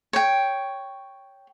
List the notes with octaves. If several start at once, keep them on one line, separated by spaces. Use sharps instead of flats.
C#5 G5